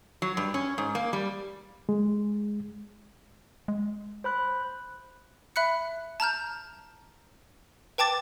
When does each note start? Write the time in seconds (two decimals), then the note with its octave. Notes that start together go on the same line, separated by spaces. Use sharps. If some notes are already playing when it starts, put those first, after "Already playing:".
0.22 F#3
0.37 G2
0.54 C#4
0.78 G#2
0.95 A#3
1.13 G3
1.89 G#3
3.68 G#3
4.24 C5 B5 F#6
5.56 E5 B5 F#6 C#7
6.20 A5 A#5 F6 G6
7.98 B4 G5 A5 D6 A6